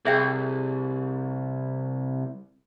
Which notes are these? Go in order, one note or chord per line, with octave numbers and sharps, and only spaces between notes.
C2 G#4 E5 G5